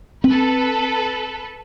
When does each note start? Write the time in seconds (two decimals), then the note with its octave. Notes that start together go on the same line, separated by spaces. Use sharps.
0.24 C4 A4 B4